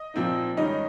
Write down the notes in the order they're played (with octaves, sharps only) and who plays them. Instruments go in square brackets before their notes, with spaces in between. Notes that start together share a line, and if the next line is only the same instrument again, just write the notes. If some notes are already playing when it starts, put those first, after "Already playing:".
Already playing: [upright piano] D#5
A#2 F3 C4 D#4
G#2 D#3 G3 C#4 D#4 D#5